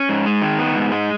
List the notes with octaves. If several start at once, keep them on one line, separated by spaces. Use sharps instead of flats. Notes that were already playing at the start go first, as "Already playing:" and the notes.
Already playing: C#4
G#2
G#3
D#3
B3
G#2
G#3